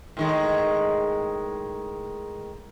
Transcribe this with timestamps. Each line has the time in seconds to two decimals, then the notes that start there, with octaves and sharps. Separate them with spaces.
0.17 A2 D#3 G#3